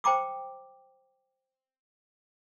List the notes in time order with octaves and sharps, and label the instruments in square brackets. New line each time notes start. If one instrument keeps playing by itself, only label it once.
[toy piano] C5 G5 A#5 D6 D#6